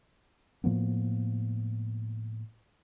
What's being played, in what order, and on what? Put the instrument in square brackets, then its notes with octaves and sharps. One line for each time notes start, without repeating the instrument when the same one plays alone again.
[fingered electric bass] A2 F3 A#3 B3